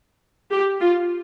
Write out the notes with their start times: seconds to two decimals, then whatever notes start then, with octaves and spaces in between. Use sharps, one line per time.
0.51 G4
0.80 F4